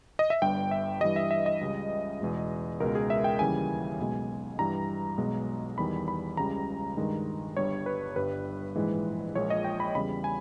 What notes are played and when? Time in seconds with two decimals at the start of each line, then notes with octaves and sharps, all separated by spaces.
0.19 D#5
0.30 E5
0.42 G1 G2 G3 G5
0.71 E5
1.01 G2 E3 G3 D#5
1.16 E5
1.31 E5
1.46 D#5
1.61 C#2 C#3 G3
2.21 E2 B2 G#3
2.80 C#2 B2 G#3 A#4
2.95 G#4
3.10 E5
3.24 G5
3.39 D#2 C#3 E3 G3 G#5
3.99 B1 B2 G#3
4.59 G2 E3 G3 A#5
5.18 B1 B2 G#3
5.78 E2 D#3 G3 B5
6.08 B5
6.37 C#2 C#3 G3 A#5
6.97 G2 D#3 G#3
7.56 G1 G2 G3 C#5
7.86 B4
8.16 G1 G2 G3 B4
8.76 A#1 G#2 E3 G#3
9.35 A#1 A#2 G#3 C#5
9.50 D#5
9.64 G5
9.80 B5
9.95 E2 C#3 G3 B5
10.24 G#5